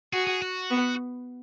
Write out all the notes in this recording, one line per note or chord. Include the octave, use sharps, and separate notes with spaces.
F#4 G#4
G#4
F#4
B3